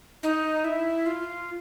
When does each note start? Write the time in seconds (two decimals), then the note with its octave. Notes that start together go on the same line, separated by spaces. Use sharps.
0.23 D#4
0.64 E4
1.06 F4